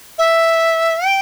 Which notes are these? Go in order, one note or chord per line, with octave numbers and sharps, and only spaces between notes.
E5
G5